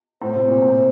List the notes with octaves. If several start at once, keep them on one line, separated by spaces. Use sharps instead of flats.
A2 C5
C3
A#2
A2